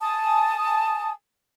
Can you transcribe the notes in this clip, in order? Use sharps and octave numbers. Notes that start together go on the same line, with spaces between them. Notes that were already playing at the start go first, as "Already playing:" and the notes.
G#5 A5 D#6